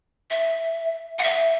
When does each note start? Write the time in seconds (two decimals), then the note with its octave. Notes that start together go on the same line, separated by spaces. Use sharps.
0.30 E5
1.19 F#5
1.23 E5